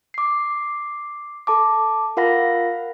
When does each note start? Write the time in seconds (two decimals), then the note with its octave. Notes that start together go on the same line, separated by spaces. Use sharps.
0.14 D6 C7
1.47 A4 A5 D6
2.17 F4 A#4 F5 F#5 B5 A#6